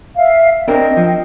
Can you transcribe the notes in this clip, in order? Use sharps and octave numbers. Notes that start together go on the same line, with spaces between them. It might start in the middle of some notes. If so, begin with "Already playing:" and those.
E5 F5
C4 D4 A#4 D#5 G5
F3